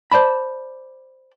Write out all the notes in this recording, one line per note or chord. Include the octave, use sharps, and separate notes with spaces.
C5 D5 A5 B5